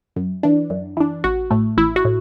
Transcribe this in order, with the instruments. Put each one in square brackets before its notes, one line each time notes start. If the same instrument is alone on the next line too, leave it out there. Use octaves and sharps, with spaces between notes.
[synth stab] F#2
E3 D4
F#2
E3 D4
A1 F#4
A2 A3
A1 E4
F#4
A2